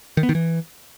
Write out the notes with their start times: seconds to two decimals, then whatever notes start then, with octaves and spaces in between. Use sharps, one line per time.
0.17 D#3
0.23 B3
0.29 D#3
0.35 E3